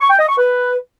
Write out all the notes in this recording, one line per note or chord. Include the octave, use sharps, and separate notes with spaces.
C#6
G5
D#5
C#6
B4